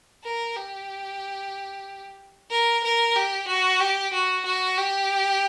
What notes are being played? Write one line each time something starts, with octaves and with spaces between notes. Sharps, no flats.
A#4
G4
A#4
A#4
G4
F#4
G4
F#4
F#4
G4